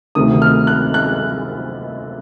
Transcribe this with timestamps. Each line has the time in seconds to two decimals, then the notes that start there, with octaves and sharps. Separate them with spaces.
0.15 D2 C3 D#3 D#6
0.42 F6
0.67 F#6
0.94 F#6